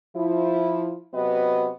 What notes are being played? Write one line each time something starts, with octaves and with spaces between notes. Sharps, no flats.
F3 E4
C3 F#3 B3 B4 D#5